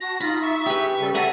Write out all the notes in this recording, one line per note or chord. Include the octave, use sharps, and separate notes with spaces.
F#4 A5 A#6
D#4 F4 B5
E5 C#6
G4 G#4 B4
C#3 G3 A4
A4 D5 E5 F#5 G#5 A#5